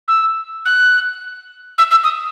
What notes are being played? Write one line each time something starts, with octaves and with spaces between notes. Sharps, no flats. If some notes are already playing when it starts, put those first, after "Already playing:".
E6
F#6
E6
E6
D#6